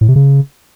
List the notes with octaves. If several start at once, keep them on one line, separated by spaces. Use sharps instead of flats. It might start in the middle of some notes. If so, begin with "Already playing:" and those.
A2
C3
C#3